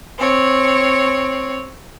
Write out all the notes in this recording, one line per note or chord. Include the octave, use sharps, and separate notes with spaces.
C4 C#5